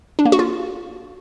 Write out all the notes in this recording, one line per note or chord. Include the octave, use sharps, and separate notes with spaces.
D4
A#3
F#4
F4